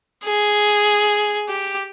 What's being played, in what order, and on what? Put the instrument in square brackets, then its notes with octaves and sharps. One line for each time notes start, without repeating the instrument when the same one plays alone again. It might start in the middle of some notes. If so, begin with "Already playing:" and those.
[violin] G#4
G4